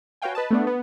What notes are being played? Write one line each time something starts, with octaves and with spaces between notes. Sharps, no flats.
F#4 B4 C#5 F5 G5 G#5
B4 D#5 A5
A3 B3 D4
B3